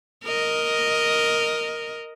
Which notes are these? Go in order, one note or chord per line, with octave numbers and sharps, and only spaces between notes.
A#4 D#5